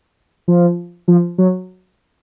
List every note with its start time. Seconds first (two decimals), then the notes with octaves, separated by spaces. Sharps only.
0.48 F3
1.08 F3
1.38 F#3